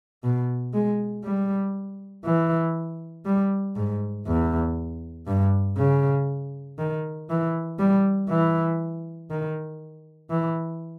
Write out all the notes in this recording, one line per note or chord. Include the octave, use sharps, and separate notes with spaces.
B2
G#3
G3
E3
G3
G#2
E2
G2
C#3
D#3
E3
G3
E3
D#3
E3